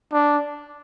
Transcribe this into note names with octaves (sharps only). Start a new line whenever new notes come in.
D4